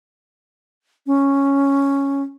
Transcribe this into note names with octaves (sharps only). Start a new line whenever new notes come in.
C#4